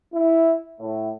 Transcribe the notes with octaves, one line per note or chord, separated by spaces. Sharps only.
E4
A2